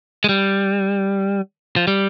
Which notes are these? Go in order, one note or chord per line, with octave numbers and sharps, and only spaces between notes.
G#3
G3
F3
G3